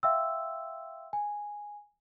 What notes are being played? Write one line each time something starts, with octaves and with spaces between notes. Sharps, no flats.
E5 F5 G5 C6 E6
G#5